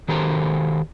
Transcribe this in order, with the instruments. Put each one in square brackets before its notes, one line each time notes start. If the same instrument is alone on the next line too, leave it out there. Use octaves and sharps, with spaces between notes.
[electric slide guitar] D#3 F#4 G4 A4 C5 A#5